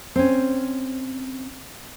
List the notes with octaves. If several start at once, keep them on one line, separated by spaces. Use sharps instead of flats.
C4 C#4